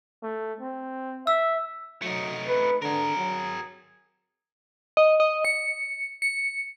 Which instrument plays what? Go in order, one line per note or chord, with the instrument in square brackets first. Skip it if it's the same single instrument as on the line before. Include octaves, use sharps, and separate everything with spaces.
[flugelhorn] A3
C4
[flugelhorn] E5 [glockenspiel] E6
[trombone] F#3 [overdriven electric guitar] A3 D#4
[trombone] B4
[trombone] D3 [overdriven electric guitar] G#4 A#4
[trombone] F#3
[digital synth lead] D#5
D#5
C#7
C#7